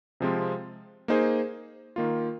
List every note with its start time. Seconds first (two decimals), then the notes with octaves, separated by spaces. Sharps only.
0.20 C3 F3 G#3 C4 F4
1.08 A#3 D#4 G#4 C5
1.96 D#3 A#3 F4